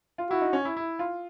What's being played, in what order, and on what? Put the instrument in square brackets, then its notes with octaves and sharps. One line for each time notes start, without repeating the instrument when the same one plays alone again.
[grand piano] F4
[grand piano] E4 [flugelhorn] F#4
[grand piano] D#4
C#4
E4
E4
F4